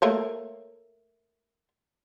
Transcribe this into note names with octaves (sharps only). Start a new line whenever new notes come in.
A3 A#3 C#5